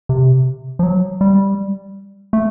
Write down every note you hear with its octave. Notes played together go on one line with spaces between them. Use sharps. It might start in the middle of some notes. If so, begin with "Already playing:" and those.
C3
F3
F#3
G3
A3